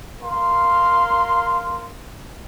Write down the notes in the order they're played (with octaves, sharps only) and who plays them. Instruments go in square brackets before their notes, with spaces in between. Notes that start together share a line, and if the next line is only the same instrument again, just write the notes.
[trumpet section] A#4 F5 C6